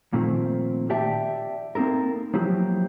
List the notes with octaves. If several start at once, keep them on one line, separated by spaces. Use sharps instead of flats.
A#2 D#3 F3 A3 C4
G4 D5 E5 G5 A5
A#3 C4 D#4 A4 A#4
F3 F#3 A#3 E4 G4